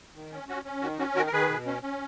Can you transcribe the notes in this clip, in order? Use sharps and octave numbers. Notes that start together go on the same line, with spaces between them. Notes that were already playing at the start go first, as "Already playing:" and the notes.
D#3
C#4
C#4 F#4
C#4
D#3 F#4
C#4 F#4
D#3 F#4 A#4
A#4
D#3 G#4 B4
B2
C#4
C#4